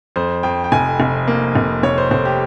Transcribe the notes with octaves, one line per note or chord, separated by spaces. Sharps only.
F2 C5
F2 G5
G5
F1 G#5
F1
A#3
F1
F1 C#5
C5
F1 C5
G4